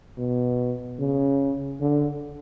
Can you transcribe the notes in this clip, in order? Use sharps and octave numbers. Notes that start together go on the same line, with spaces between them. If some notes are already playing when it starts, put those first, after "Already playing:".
B2
C#3
D3